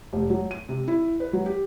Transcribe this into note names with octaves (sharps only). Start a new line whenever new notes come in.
F1
F#3
D#7
C3
E4
B4
F#3
G4